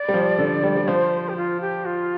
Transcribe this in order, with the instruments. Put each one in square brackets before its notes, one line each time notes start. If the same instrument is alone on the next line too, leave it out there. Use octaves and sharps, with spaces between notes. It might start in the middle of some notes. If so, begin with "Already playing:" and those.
Already playing: [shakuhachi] D5
[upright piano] G3
F3
D3
G3
G3
[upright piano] F3 [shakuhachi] C5
[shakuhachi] G4
F4
G4
F4